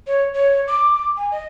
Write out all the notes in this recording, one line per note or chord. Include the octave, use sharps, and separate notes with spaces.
C#5
C#5
D6
G#5
D#5